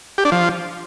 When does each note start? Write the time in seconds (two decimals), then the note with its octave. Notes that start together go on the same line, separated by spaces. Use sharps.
0.18 G4
0.25 D4
0.32 F3